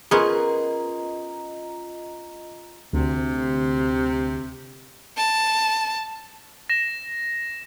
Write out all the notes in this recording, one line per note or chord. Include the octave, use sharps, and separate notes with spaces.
B3 C#4 F4 G#4 A#4 D#5 A#5 C6
D2 C3
A5
A#6 E7